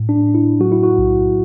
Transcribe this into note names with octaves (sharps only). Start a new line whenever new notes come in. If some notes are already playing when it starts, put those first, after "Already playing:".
Already playing: A2
D4
A2
E4
F#3 F#4
E4
F#4
B1